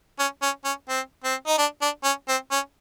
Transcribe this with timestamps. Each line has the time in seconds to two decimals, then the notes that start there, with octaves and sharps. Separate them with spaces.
0.19 C#4
0.42 C#4
0.65 C#4
0.89 C4
1.24 C4
1.47 D#4
1.58 D4
1.82 D4
2.04 C#4
2.28 C4
2.51 C#4